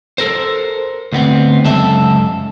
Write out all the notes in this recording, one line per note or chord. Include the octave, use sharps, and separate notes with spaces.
A4 A#4 C5
D2 B3 C4
C#2 F#2 A4 E5